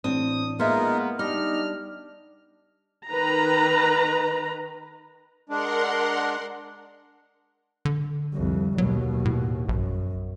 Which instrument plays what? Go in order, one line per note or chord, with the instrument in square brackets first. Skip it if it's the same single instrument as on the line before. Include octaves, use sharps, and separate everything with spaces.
[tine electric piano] A1 A2 D4 [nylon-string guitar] C4 [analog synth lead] D#6
[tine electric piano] G#3 [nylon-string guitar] A#3 E5 [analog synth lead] B3 [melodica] D#4 F4 A#4
[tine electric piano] G3 D4 [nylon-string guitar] D#4 [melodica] G4 D#5 [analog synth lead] F6
[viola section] D#3 B4 A#5
[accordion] G#3 D4 [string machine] A#4 F#5 C6
[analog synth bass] D3
[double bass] C2 F2
[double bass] D#2 B2 [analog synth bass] F#3
[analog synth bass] A2
[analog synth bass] A#1 [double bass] F#2